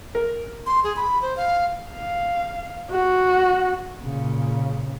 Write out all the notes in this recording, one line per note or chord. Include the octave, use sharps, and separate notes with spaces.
A#4
C6
G#4
B5
C5
F5
F5
F#4
A#2 C#3